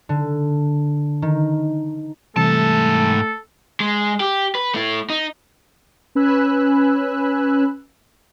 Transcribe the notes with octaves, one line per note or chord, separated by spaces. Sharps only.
D3
D#3
G#2 C3 E3 G3 A3 A4 A5
G#3
G4
B4
A3 E4
D#4
C#4 B4 G#5 B5 E6 F#6